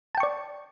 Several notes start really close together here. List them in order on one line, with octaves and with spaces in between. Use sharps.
A5 G5 C#6 D5